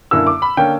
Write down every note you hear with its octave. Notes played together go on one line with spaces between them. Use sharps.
F#2 D3 A#3 E4 E6
D6
B5
D3 A#3 C#4 G5